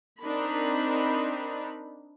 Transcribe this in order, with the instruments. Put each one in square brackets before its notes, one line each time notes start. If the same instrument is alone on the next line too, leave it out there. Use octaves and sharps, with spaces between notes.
[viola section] C4 D4 D#4 A#4 B5